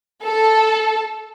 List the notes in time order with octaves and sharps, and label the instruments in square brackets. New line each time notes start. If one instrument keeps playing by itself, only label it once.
[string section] A4